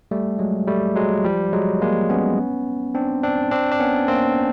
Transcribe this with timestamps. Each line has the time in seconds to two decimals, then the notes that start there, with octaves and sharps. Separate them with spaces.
0.11 G3 A3
0.39 F#3 G#3
0.67 G3 A3
0.96 F#3 G#3
1.25 F3 G3
1.53 F#3 G#3
1.81 G#3 A#3
2.09 B3 C#4
2.95 C4 D4
3.23 C4 D4
3.51 C4 D4
3.72 D4
3.80 B3 C#4
4.08 A#3 C4